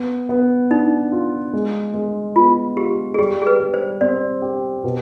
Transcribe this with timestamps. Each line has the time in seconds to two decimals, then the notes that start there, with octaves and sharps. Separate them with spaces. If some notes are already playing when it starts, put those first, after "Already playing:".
Already playing: B3
0.29 B3
0.71 D4 D#4
1.12 F4
1.53 G#3
1.94 G#3
2.36 B3 F4
2.77 F4 G4
3.14 G#4
3.18 G3 G4
3.42 G#4
3.47 B4
3.60 G3
3.74 C5
4.01 C4 D5
4.42 G4
4.84 B2